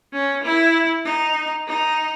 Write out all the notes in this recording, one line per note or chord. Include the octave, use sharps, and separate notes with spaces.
C#4
E4
D#4
D#4